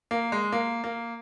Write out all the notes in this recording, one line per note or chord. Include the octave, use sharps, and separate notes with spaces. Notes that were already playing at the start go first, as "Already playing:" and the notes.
A#3
G#3
A#3
A#3